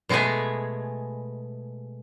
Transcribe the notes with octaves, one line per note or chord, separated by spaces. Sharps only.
B2 G#3 A3 B3 G#4